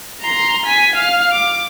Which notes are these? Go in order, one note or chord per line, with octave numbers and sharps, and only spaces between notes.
A#5 C6
G#5 B6
F5 F6
D6